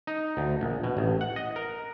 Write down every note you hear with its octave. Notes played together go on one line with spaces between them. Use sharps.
D#4
D2
A#1
B2
A1
F#5
D#5
A#4